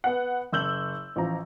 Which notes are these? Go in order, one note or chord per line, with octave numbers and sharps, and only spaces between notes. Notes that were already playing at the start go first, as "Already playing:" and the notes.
B3 F#5
F#1 E6 G6 F#7
A1 F3 A#5